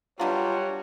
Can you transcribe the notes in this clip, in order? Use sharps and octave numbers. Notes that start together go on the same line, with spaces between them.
B2 D3 F#3 G3 F4 F#4 C#5